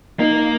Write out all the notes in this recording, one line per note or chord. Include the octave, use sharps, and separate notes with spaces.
A#3 D#4